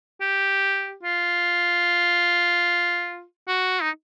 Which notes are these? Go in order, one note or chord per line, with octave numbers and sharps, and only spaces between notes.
G4
F4
F#4
D#4